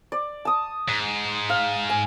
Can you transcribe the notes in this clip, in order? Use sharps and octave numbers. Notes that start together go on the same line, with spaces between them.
D5
A5 D#6
G#2
F5
G#5